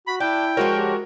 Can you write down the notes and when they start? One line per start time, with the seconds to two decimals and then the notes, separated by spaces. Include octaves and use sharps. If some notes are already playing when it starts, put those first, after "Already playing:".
0.07 F#4 B5
0.20 D4 E4 G5
0.57 F3 G#3 F#4 A#4 C#5
0.76 G4